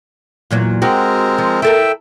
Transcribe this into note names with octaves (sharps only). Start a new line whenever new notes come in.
E2 A#2 F#3
G#3 C4 F#4 G4 A#4
F3
E4 A4 A#4 E5 G5